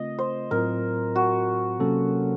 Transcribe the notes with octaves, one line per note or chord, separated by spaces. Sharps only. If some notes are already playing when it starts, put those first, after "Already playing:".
Already playing: C#3 A3 C4 F4 D#5
C5
A2 F#3 C4 F4 A#4
F#4
C3 F#3 A#3 C#4 A4